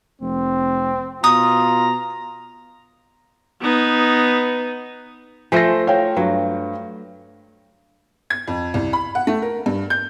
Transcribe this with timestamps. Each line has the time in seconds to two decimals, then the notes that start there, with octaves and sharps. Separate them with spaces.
0.21 F1 C4
1.24 B2 F4 A#5 D#6
3.62 B3 D#4
5.52 F3 A3 C5 G#5 A#6
5.87 C#5 F5 G5
6.17 G2 F#3
8.30 G#6
8.48 F2
8.74 C2
8.93 B5
9.15 F#5
9.27 A3
9.42 A#4
9.66 G2
9.90 G6